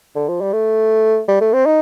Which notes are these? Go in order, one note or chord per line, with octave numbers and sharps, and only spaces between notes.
D3
F3
G3
A3
G3
A3
C4
D#4